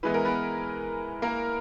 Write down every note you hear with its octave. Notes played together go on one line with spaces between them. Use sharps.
E3 G#3 B3 B4
A#4
B3 B4
A#3 A#4